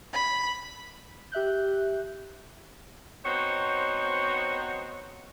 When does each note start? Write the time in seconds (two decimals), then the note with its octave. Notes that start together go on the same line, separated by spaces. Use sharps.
0.13 B5
1.32 G4 E5 F#6 G6
3.25 B3 C4 D#4 F#4 C5 C#5